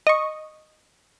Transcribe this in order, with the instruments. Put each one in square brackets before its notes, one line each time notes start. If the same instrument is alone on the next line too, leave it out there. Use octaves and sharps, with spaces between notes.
[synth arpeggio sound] D#5 C#6